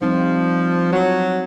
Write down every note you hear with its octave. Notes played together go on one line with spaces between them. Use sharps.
F3 G3 C4 D#4
F#3